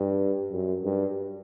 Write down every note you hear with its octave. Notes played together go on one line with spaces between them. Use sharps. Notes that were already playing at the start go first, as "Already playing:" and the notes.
Already playing: G2
F#2
G2